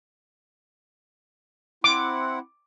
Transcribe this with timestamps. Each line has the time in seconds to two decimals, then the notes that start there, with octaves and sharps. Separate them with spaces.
1.84 C4 E4 F#5 D6